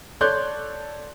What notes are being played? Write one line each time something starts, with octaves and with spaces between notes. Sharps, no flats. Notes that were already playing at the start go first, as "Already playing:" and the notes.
A4 C#5 D5 C6 F#6 G6